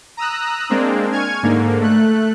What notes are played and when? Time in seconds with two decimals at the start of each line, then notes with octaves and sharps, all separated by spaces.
0.17 A#5 D#6 E6 F#6
0.69 G#3 A#3 C4 D4
1.12 G#5 C#6 F6 G#6
1.43 G#2 D3 A#3
1.81 A3 F#6